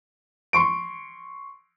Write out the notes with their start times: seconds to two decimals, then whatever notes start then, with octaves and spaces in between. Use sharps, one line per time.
0.53 C6 C#6 D7